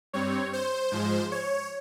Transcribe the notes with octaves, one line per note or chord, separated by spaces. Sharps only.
G2 G3 C4 C#5
C5
G#2 F3 G#3
C#5